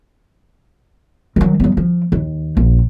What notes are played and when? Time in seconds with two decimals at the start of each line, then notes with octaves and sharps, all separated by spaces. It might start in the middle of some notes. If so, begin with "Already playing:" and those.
1.36 D#3 F#3
1.60 F#3 B3
1.77 F3
2.12 D#2
2.57 A#1